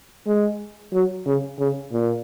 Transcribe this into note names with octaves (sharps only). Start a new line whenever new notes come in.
G#3
F#3
C#3
C#3
A#2